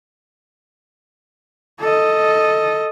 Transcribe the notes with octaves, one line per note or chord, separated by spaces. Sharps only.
A4 D#5